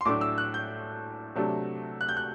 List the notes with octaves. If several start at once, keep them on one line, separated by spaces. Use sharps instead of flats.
C6
A2 F#3 A3 D4 D6
E6
F#6
G6
C3 F#3 A3 D4
F#6
G6
F#6